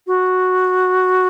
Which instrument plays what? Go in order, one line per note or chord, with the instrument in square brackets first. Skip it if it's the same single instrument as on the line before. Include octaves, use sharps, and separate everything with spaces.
[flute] F#4